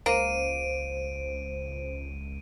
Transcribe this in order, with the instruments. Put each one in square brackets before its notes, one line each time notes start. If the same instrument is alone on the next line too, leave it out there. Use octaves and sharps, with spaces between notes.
[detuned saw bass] C#2 [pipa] A#3 [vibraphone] C5 [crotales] D7 D#7